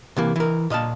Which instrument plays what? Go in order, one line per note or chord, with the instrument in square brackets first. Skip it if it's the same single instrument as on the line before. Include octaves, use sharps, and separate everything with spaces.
[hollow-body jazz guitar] C3 E3 A#3
E3 A#4
A#2 D#5 F5 A5